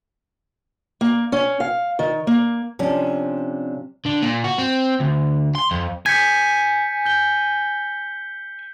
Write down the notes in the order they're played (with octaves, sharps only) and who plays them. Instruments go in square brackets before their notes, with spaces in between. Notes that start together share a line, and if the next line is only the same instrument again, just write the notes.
[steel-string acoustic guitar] A#3
C#4
F5
D#3
A#3
C3 F3 C#4 D4
[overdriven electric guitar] D3
A#2
F#4
C4
D2
C6
F2
[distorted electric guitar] G#5 [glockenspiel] G6 B6 C#7 [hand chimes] G#6
[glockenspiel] G6 G7